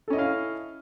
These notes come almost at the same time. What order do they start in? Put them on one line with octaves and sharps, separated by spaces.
A4 C#4 D#5 E4 F5